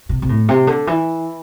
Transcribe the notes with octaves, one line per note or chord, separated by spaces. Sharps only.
C3
C3
A2
C3
D3
E3